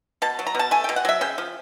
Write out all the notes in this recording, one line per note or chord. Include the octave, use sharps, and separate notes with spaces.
B2 A5
F#3
A#5
B2 A5
A3 G#5
B2 G5
F#5
F#3 E5
C#3 G5
F3